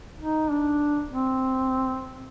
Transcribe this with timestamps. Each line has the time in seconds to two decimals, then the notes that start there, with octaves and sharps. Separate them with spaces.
0.20 D#4
0.50 D4
1.11 C4